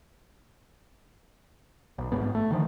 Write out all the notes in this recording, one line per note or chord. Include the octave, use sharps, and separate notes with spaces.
B1
G1 G#2 B3
A3
D3 D#3 F3